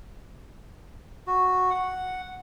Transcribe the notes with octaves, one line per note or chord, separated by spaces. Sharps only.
F#4
F#5